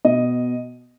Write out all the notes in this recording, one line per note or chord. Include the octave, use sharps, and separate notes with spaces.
B2 D#5